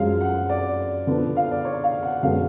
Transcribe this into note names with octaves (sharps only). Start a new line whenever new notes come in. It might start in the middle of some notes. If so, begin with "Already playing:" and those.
Already playing: F#2 F3 G#3 F5
F#5
D5
D3 F3 B3 D4
F5
D5
C#5
F5
F#5
F#2 D3 G#3 B3 D4 F5